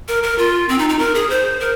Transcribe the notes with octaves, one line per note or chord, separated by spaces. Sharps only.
A#4
A#4
F4
C4
D#4
D#4
A#4
G#4
C5
A#4